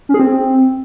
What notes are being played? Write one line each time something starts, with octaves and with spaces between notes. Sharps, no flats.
C#4
G#4
C4